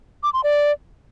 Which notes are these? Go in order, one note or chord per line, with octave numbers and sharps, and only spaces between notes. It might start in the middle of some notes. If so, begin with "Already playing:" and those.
D6
C6
D5